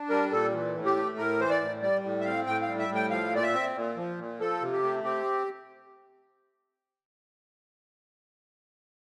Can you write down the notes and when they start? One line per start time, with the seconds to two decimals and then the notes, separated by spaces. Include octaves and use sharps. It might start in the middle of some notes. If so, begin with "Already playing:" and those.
Already playing: D4
0.10 G3 A#4
0.32 A#2 A4
0.53 E3
0.75 A2
0.85 G4
0.96 A3
1.17 A2 A#4
1.39 E3 C5
1.50 D5
1.61 A2
1.82 G3 D5
2.03 A2
2.20 E5
2.25 C4 F5
2.46 A2 G5
2.62 F5
2.68 G3
2.79 E5
2.89 A2
2.95 G5
3.11 F3 F5
3.32 A#2 D5
3.43 E5
3.54 C4
3.76 A#2
3.97 F3
4.18 A#2
4.40 F3 A4
4.61 C3
4.73 G4
4.83 A3
5.04 C4 G4